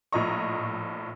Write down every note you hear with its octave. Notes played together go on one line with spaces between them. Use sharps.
A#1 A2 F3 D#5 A#5 C#6